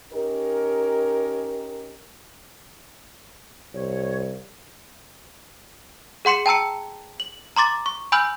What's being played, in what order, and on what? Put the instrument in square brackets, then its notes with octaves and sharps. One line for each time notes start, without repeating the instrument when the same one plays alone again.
[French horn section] C#4 D#4 G4 A#4
[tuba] C2 [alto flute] C#5
[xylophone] G#4 F#5 C6 C#7 E7
G5 A5 A#5 E6 C#7
F#7
A#5 C6 D6 A6
C#6
G#5 B5 E6 F6 G6 F#7